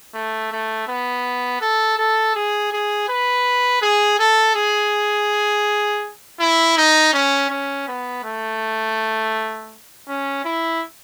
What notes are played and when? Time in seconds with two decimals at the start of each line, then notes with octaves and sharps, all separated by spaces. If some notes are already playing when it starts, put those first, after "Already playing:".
0.14 A3
0.52 A3
0.88 B3
1.61 A4
1.98 A4
2.35 G#4
2.72 G#4
3.08 B4
3.82 G#4
4.19 A4
4.55 G#4
6.40 E4
6.77 D#4
7.13 C#4
7.50 C#4
7.88 B3
8.24 A3
10.08 C#4
10.44 E4